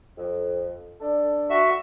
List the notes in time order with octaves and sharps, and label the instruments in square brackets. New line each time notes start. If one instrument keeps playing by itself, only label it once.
[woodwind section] F2
D4 A4
[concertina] F#4 E5